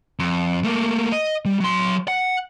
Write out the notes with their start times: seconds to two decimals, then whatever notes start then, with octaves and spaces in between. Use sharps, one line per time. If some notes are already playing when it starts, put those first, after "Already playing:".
0.19 F2
0.64 A3 A#3
1.12 D#5
1.45 G3
1.60 F#3 C6
2.08 F#5